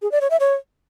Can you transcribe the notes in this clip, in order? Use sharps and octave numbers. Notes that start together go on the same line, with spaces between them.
G#4
D5
C#5
E5
C#5